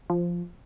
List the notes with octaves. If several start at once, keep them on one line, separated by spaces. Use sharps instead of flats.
F3